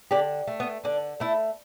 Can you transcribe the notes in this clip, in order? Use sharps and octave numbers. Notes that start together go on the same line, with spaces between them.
D3 D4 G4
A3
B3
D3 D4
A3 E4 A4